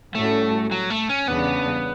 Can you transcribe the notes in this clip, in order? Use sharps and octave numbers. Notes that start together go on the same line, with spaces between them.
A2 G3 A3 C#4 F#4 A4
F#3
A3
C#4
E2 C#3 G3 B3 D4